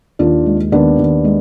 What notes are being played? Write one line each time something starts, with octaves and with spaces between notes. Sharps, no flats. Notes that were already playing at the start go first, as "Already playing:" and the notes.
D#2 D4 F4
G#3
D#2 B3 D4
D#2
G#3